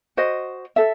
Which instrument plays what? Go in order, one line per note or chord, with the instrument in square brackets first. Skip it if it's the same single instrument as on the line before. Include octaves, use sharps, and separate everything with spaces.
[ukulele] F#4 C5 D#5
A4 E5